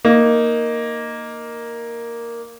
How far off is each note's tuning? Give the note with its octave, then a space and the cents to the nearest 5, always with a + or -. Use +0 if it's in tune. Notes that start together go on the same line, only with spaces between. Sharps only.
A#3 +0 D#4 +0